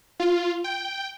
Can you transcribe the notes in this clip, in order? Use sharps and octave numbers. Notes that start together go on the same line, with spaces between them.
F4
G5